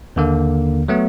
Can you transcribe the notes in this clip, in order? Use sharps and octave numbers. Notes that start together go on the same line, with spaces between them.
D#2 D3 A#3
F#3 A3 B3